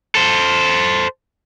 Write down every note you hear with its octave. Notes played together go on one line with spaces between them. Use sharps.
A4 C5